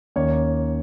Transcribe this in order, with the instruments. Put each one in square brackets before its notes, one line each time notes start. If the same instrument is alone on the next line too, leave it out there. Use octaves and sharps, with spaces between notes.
[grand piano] D#2 D#3 A#3 C#4 C#5